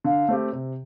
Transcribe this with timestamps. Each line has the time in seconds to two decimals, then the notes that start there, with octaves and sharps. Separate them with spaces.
0.04 D3 F5
0.28 A3 C4 G4
0.52 C3